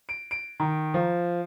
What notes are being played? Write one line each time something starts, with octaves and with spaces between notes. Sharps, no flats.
D7
D7
D#3
F3